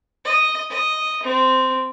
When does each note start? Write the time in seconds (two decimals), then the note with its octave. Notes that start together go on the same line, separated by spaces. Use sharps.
0.25 D#5
0.70 D#5
1.23 C4